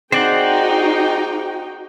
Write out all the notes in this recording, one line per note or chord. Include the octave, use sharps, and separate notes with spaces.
C4 D#4 F#4 G#4 C5 D5 F#5 G5